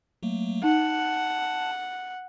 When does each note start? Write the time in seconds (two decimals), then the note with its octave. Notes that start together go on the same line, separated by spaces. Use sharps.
0.23 F#3 A3 A#3
0.64 D#4 F#5 A5